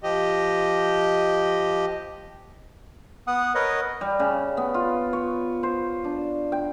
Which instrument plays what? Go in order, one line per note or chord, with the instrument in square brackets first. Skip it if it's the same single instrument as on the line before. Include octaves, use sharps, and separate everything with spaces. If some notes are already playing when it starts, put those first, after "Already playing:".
[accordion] F3 G4 D#5
[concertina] B3 F#5 D#6
A#4 B4 C#5 D#5 F#5 D#6
[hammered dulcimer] G3
C#3
B3
F4
C#5
C5
D4
G5